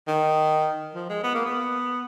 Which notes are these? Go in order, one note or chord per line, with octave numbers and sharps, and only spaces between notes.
D#3
F3
G#3
B3
A#3
B3